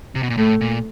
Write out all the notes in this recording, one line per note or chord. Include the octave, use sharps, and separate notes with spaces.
C3
B2
A#2
A2 A3
A#2